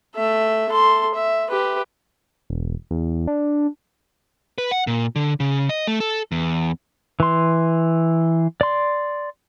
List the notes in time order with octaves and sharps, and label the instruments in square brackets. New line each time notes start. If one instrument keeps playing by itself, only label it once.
[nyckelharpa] A3 E5
A4 C6
E5
G4 B4
[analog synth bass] E1
E2
D4
[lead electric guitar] B4
F#5
A#2
D3
C#3
D#5
A3
A4
E2
[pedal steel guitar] E3 C6
D5 C6